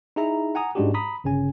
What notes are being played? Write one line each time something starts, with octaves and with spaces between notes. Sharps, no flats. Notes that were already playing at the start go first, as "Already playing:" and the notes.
D#4 E4 G#4 E5 A#5
F#5 G#5 A#5 D#6
G#2 G#3 C#4 D4 F#4 G4
A#5 B5 D#6 B6
G1 C#3 C#4 G#5